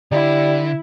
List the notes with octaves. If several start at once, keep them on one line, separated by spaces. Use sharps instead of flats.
D3 G3 E4